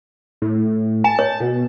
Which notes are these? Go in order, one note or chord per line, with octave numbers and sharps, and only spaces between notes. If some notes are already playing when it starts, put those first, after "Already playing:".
A2
G#5 A5
C#5
B2